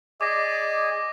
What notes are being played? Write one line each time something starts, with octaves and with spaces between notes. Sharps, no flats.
G#4 D5 D#5 G#5 D6 A#6